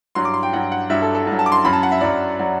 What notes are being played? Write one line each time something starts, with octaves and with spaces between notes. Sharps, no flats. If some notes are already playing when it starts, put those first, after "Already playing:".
G2 F#3 C6
D6
C6
G5
G2 F#3 F#5
F#5
G2 F#3 E5
A4
A4
G2
F#3
A5
D6
C6
F#2 F#3 B5
A5
F#5
E5
F#2 F#3 D5
F#3 D5